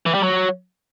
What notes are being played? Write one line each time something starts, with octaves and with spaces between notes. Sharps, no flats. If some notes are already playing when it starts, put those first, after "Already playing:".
E3
G3
F#3